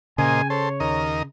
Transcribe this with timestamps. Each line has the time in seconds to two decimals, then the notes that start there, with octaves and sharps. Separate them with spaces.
0.18 A#2 C#3 C5 D#5 G#5
0.50 A4 C5 C#5
0.80 D#2 A#4 D#5